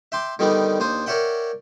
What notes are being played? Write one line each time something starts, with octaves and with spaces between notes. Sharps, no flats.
E5 G5 C6 D6
D3 D#3 G3 B3 D4 D#4
D#2 D4 C5 D#6
A#4 C#5 D5 E5 F#5 G5